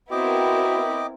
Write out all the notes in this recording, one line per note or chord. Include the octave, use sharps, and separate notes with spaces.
B3 C4 E4 F#4 A#4 D#5 G5 D6